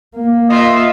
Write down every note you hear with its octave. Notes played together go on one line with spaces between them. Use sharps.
A#3
F4 D#5 E5